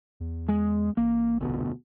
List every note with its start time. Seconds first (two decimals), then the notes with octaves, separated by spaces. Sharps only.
0.20 E2
0.48 G#3
0.97 A1 A#3
1.41 F1 D2 B2